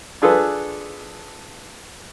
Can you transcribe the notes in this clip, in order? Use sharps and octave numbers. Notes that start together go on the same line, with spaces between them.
D4 F4 G#4 A4 B4